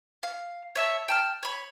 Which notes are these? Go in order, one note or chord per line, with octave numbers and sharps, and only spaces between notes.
F5
C#5 E5 A5
G5 A5 F6
C#5 B5